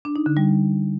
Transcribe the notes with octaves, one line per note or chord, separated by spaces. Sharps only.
D4
D#4
D3
G3